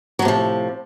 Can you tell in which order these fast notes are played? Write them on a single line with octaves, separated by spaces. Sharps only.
F#3 A2 C3 F3